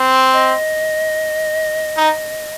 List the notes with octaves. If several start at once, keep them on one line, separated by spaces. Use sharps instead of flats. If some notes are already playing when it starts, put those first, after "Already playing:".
Already playing: C4
D#5
D#4